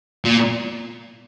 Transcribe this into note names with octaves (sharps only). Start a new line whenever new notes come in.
A#2